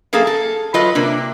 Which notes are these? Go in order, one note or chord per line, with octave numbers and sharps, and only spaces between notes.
F#2 A#3 G#4 A4 F5
A4
F#3 F4 B4 D#5
C3 A#3 D4